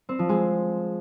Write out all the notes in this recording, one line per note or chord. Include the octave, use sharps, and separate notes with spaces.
C4
F3
G#3